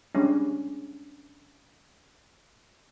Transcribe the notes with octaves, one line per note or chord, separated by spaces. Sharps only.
G3 G#3 C#4 D4